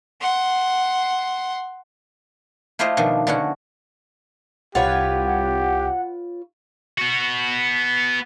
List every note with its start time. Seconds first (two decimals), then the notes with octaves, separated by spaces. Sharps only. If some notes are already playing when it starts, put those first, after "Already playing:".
0.21 F#5 C6
2.79 A3 E4 F4 G4 C5 D#5
2.97 B2 D#3 F3 D4
3.27 D3 B3 C#4 F#4
4.75 C2 F4 G4 B4 C#5 F#5
6.98 B3 F#4